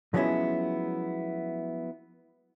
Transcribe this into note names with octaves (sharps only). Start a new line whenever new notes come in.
F3 F#3 G#3 B3 C#4 E4